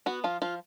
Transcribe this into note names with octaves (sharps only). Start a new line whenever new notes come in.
B3 F#4
F3 F4
F3 F4